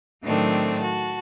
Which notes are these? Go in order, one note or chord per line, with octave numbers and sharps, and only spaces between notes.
A2 D#3 F#3 A3 C4 D4
F#4 A5